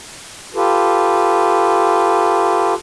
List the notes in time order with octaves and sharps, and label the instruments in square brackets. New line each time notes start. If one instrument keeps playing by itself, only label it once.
[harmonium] F4 G4 A4 B4